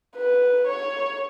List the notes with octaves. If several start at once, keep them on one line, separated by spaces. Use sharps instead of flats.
B4
C#5